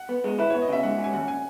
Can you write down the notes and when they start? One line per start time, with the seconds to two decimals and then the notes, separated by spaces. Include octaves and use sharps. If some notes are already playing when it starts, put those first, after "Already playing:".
Already playing: F#5
0.09 B3
0.24 G#3
0.39 E4 B4
0.50 B3 C#5
0.62 D#5
0.68 C#3 E5
0.83 G#2 F#5
0.98 C#4
1.04 G#5
1.13 D#2 F#5
1.28 G#5